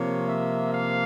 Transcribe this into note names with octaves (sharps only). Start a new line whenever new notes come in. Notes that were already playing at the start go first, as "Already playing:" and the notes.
Already playing: C3 F3 A#3 C#5
E5
F5